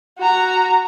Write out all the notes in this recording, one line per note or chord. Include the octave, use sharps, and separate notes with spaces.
F#4 A#5